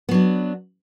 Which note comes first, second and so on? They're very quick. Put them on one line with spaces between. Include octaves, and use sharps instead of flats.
B3 F#3 D4